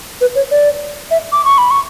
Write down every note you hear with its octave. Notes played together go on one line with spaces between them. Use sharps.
B4
C#5
D5
E5
D6
C#6
B5
C#6